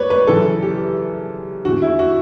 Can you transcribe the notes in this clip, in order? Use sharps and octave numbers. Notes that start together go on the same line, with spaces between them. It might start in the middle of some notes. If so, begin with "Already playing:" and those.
Already playing: B4 C#5 D5
B4
F#2 C#3 E3 A4
G4
E2 D3 F#4
E4
F#4